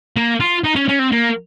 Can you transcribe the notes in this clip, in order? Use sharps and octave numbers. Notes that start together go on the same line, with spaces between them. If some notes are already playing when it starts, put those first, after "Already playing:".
A#3
F4
D#4
C#4
C#4
C4
A#3